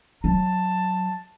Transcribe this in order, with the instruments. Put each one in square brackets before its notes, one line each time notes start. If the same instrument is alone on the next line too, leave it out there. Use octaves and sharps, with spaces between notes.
[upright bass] F#3 [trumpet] A5